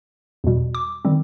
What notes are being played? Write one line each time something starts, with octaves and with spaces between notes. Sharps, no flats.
E2 B2 G3
D6
D#3 G3 C4